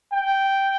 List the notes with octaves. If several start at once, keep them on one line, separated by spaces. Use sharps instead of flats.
G5